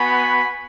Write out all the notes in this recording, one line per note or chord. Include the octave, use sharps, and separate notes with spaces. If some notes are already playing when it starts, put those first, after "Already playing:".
Already playing: B3 F#4 G#5 B5